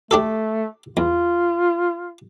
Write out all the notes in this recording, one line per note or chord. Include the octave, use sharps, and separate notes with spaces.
A3 D4 G4 A4
E2 F4